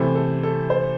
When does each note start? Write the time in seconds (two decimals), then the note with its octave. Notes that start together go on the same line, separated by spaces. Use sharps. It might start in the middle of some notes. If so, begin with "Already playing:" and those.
Already playing: C3 E3 A3 C5
0.15 A4
0.43 A4
0.70 C5